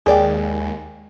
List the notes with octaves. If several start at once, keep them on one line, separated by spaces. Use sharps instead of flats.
D#2 G#3 A#3 G#4 D5 G5